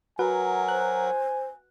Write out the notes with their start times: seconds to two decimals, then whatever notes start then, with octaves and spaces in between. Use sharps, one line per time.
0.19 F#3 F#4 A#4 B4 F#5 G#5
0.68 C5 F#6